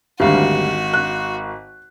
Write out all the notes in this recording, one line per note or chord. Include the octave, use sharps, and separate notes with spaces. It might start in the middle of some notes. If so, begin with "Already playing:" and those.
G#1 D2 G3 F#4 F5
F#6